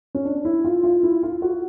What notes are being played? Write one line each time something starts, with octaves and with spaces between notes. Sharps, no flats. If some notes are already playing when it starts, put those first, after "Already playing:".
C#4
D4
E4
F4
F4
E4
F4
F#4